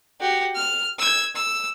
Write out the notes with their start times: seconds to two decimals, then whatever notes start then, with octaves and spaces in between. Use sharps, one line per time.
0.20 F#4 G4
0.55 F6
0.98 E6 G#6
1.36 E6